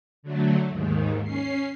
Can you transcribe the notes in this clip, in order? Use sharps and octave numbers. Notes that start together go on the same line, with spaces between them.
D3 F#3 A3
D#2 G#2 D#3
C#4 C7